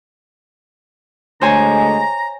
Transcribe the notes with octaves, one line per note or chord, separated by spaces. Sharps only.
D2 D3 G#3 C5 C#5 G#5 A#5